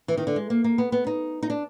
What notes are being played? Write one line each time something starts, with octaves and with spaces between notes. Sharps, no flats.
E3
D#3
D3
G#3
A#3
A#3
B3
B3
D#4
D#4
D4